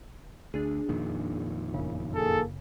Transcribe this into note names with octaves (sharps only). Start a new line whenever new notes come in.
D2 D4 G#4
F2 A#2 D#3
G1 F#2 C#3
A#3 G#4 A4